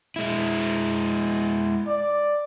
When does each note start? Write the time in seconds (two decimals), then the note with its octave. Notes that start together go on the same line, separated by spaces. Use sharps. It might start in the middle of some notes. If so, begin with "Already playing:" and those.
0.16 G#3 E4
1.87 D5